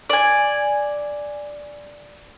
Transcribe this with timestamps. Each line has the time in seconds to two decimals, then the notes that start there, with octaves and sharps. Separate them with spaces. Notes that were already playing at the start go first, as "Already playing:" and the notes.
0.10 D5 G#5